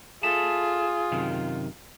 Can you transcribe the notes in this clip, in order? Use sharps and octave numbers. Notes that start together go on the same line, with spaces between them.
F4 G#4 A4 E5 A5
F#2 C3 D#3